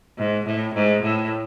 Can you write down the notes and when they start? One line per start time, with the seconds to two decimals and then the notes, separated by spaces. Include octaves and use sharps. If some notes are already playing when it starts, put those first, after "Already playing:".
0.18 G#2
0.46 A2
0.75 G#2
1.03 A2